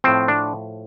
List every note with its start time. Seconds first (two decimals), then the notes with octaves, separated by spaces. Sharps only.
0.04 A2 F3 C4
0.28 D4